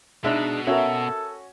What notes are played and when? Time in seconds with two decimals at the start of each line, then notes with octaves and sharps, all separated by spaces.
0.24 B2 G#3 D4 D#4 E5
0.67 C#4 F#4 A4 A#4 E5